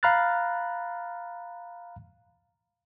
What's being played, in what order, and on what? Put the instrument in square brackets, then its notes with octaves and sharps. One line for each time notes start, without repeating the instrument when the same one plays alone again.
[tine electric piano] F5 A#5 B5 F6 F#6 A6